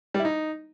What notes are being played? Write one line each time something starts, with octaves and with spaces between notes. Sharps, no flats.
G3
E4
D#4